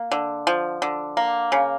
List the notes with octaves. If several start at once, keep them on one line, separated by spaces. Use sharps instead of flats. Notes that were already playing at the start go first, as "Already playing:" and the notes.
Already playing: A#3
D3
F3
D3
A#3
C#3